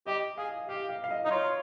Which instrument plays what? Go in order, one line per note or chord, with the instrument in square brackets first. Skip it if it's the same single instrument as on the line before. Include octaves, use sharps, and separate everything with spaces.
[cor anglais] G4 [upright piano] D#5
[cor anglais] G#4 [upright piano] F5
[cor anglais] G4 [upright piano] F5
[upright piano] F5
F5
D#5
[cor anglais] D#4 [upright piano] D#5
[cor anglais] F4 [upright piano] C#5